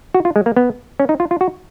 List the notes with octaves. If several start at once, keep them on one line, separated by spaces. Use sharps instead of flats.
F#4
F4
G#3
A#3
B3
C#4
D#4
F4
F4
F#4